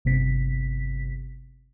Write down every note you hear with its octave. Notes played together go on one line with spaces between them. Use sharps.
G1 C3 B6